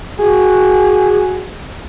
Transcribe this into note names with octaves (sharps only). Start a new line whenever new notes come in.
F#4 G#4